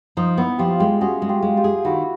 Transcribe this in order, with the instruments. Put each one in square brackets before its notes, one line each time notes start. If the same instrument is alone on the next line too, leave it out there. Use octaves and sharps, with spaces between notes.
[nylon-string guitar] F3 [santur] D#4
[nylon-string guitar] B3 [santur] E4
[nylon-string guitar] F3 [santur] F4 G4
[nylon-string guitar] G#3 [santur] F4 G4
[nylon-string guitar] C#4 [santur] F#4 G#4
[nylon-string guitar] G#3
[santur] F4 G4
[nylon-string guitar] G#3
[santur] F4 G4
[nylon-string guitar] G#4
[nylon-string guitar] D#3 [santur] E4 F#4